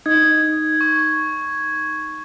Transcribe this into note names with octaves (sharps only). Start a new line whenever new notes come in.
D#4 G#6
C#6